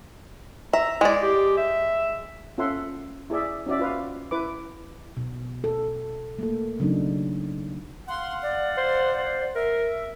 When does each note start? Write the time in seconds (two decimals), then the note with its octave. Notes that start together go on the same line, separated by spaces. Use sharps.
0.73 E5 A#5
1.01 G#3 E4 D5
1.22 G4
1.58 E5
2.58 C#4 F4 A4 E5 F#5 C6
3.30 E4 G#4 D5 E5
3.66 C#4 D#4 F#4 D5 E5
3.79 F4 B4 F5
4.31 E4 B4 D6
5.17 B2
5.64 A4
6.39 A3 A#3 A4
6.80 C#3 F#3 D4 D#4
8.09 F5 F#5 C6
8.42 D5
8.77 C5
9.18 C5
9.55 A#4 E5